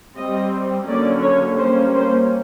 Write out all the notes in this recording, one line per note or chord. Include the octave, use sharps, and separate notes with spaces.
G3 C4 D#5
D3 F#3 A#3 C#4 D5
C#5
G3 A#3 C#4 C5
C5